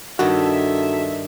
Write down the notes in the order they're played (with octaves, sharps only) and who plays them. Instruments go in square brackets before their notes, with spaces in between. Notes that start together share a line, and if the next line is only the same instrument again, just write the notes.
[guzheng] G2 D#3 [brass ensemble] D#4 A4 E5 [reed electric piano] F#4